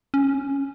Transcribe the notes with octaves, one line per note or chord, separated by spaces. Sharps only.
C#4